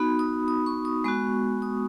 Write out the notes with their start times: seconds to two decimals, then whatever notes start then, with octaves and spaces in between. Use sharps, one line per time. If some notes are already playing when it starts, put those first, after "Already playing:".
Already playing: B3 D#4 F#4 B5
0.19 D#6
0.48 D#6
0.66 C#6
0.85 D#6
1.04 G#3 B3 F#4 C#6
1.62 D#6